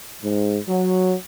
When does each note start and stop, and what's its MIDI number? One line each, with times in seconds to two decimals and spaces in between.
0.23 0.59 44
0.68 1.14 54